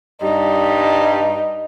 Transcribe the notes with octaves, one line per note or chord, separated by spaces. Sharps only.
G2 G3 D#4